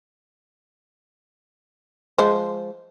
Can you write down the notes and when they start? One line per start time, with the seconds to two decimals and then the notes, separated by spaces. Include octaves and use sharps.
2.18 F3 G#3 C5